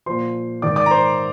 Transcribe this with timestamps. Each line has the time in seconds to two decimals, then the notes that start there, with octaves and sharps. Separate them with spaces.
0.06 A#2 F3 C5 C6
0.62 G#2 D#3 D5 D6
0.76 D5 D6
0.86 A#5
0.91 C5 C6